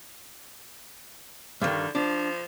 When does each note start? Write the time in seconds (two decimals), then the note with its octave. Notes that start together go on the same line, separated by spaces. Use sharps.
1.62 G2 D3 D#3
1.95 F3 D4